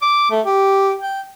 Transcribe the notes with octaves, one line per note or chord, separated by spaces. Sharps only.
D6
A3
G4
G5